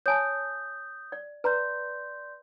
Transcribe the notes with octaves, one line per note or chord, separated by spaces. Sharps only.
C#5 G#5 A5 D#6 G6
D5
B4 D5 A#5 C6 G6